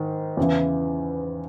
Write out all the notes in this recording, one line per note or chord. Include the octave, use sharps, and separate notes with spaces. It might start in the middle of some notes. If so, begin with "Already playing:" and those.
Already playing: G#2 D#3
E2 C#3 E3